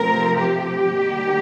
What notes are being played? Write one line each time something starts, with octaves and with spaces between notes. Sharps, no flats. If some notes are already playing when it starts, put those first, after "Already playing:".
Already playing: C3 F3 A3 C4 A#4
G4
D#3 G3 A#3